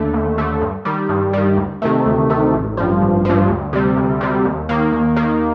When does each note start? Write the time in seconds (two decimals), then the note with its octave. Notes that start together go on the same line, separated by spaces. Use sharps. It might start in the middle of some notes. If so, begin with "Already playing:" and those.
Already playing: D#2 D3 A3
0.13 D#2
0.38 D3 A3
0.61 G2
0.85 D#3 G3
1.09 G2
1.33 D#3 G3
1.57 D2
1.82 C3 D#3 A3
2.06 D2
2.30 C3 D#3 A3
2.54 A1
2.77 G2 F3
3.01 A1
3.25 G2 F3
3.49 D2
3.73 C3 G3
3.97 D2
4.21 C3 G3
4.45 D#2
4.69 D#3 A#3
4.92 D#2
5.16 D#3 A#3